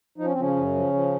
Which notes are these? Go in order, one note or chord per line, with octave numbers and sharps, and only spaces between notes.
F3 D#4
C#4
C4
C#3 F3 C#4
F#2
F3
F3